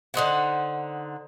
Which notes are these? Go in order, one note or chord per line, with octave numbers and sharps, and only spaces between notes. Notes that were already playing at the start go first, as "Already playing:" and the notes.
D3 D#4 C5 F#5